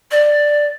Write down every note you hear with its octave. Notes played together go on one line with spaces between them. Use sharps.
D5